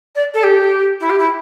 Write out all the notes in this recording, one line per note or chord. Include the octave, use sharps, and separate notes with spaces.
D5
A4
G4
E4
G4
E4